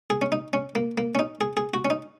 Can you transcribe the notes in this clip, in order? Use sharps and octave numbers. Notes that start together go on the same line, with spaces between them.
G#4
C#4
D#4
C#4
A#3
A#3
C#4
D#4
G#4
G#4
F#4
C#4
D#4